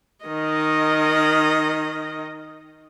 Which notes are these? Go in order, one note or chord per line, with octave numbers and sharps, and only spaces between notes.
D#3 D#5